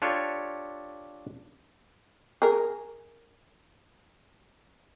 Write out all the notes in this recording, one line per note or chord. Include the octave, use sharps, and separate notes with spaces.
D4 F4 G4 A4 C#5
G#4 A#4